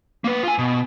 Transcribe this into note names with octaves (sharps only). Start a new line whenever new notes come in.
A#3 B4
F4 G#5
B2